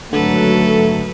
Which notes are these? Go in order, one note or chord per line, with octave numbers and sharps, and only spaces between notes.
G#1 D3 F#3 A3 A4 B4